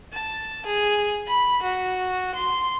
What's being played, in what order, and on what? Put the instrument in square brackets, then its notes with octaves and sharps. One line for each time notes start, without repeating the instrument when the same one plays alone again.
[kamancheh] A5
G#4
B5
F#4
C6